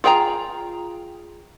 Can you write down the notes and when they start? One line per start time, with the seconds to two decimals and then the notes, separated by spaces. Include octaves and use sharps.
0.04 F4 G#4 G5 G#5 A#5